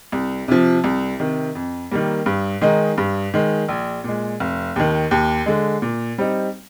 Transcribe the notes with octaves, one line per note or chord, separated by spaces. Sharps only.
C2
C3 F3
C2
C3 D#3
F2
D#3 G3 A#3
G2
D#3 G#3 D#4
G2
D#3 G#3
A#1
A#2 G#3
F1
D#2 D#3
D#2
D3 G#3
A#2
G3 C4 D#4